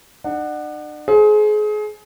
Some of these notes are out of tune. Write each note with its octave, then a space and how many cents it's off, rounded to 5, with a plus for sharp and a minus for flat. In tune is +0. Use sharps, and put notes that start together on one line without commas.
D4 +40 F#5 +0
G#4 +30 C5 +10